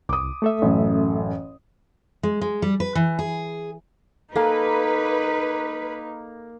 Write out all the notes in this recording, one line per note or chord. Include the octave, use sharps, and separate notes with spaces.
C2 D6 D#6
A3 A4 E5
A1 F#2
G#3
G#3
G3
B4
E3
G#4
A#3 D#4 A4 B4 F5 G#5